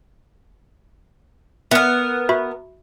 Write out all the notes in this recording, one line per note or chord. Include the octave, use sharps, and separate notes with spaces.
B3 A#4 E5
F#4 E5 B5